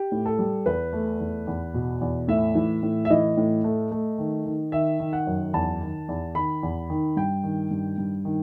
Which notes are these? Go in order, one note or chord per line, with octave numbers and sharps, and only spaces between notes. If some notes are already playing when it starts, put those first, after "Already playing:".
Already playing: G4
A2
A4
G3
E2 B4
A3
E2
E2
B2
E2
A2 E5
E3
A2
E5
E3 D#5
A2
A3
A3
D#3
D#3
D#3 E5
D#3
F#5
F#2
E2 A5
D#3
E2
D#3 B5
E2
D#3
G2 G5
D#3
G2
G2
D#3